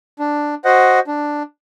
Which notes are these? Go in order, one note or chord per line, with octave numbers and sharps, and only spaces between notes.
D4
F#4 C5 D#5 F#5
D4